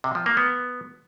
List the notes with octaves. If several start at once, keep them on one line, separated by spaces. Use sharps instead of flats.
C3
F3
A#3
B3